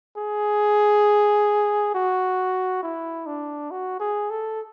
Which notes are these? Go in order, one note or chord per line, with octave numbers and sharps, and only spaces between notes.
G#4
F#4
E4
D4
F#4
G#4
A4